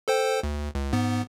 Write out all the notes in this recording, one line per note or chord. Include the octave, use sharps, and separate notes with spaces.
A4 C5 G5
D2
C#2
G#2 B3